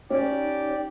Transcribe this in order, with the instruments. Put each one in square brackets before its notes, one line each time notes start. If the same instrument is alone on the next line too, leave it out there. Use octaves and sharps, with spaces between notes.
[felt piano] C#4 [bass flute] D#4 [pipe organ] G4 D5